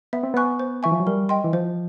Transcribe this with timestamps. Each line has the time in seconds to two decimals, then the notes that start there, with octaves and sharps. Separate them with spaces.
0.13 B3 E5
0.23 C4
0.34 B3 G#5 C#6 F#6
0.60 C5
0.83 E3 E5 G#5 C#6
0.92 F3
1.00 F#3
1.07 G3 A#4
1.29 D#5 G5 C6
1.44 E3
1.53 F3 C5